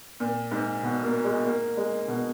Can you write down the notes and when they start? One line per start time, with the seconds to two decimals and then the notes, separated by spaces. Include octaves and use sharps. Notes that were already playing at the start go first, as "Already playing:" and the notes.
0.20 A#2
0.51 G#2
0.83 B2
1.03 A#3
1.24 G#3
1.46 A#3
1.77 G#3
2.08 B2